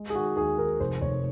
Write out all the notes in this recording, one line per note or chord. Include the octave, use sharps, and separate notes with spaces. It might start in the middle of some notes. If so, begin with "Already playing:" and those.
Already playing: G#3
G#4
D#3 F#4
D#2 G#4
D#3 A#4
F1 C5
F1 C#5